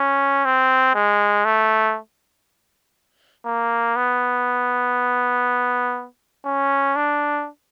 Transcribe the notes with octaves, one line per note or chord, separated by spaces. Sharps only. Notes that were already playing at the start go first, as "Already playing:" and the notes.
Already playing: C#4
C4
G#3
A3
A#3
B3
C#4
D4